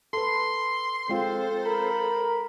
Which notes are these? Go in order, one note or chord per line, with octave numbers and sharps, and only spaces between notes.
A4 B4 C6
G#3 C4 F4 A4 C5
A#4 B5